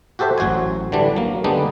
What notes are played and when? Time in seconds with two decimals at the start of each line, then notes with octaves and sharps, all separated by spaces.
0.19 F#4 G4 A4 C5 E5
0.38 A1 F#3 F#4 C5 G#5
0.92 D3 E3 G3 D4
1.16 F#3 A#3
1.44 D3 G3 G#3 B3 D4 D#4